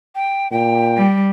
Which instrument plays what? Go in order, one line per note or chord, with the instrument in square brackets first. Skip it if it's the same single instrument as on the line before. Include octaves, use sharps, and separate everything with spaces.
[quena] G5
[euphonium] A#2 [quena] G5
[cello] G3